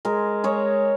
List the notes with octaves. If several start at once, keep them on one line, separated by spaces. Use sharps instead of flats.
G#3 A#4
G#3 C#5